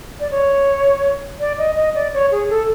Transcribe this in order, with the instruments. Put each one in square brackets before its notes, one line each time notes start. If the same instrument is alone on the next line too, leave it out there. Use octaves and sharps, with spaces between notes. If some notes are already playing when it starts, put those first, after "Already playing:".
[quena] D5
C#5
D5
D#5
D#5
D5
C#5
G#4
A4